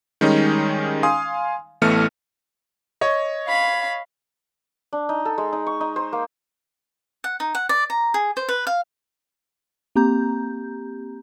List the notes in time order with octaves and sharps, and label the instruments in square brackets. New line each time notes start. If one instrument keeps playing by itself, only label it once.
[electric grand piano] D#3 G3 G#3 C#4 D#4
F5 G#5 C6 D#6
A1 E3 A3 B3 F6 C#7
[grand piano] C#5 D#5
[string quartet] F5 B5
[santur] D4
D#4
A4
G#3
D#4
C#6
D#4
C5
A#3
[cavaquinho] F#5
D#4
F#5
D5
A#5
G#4
C5
B4
F5
[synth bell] A#3 C4 G4 A#5 G6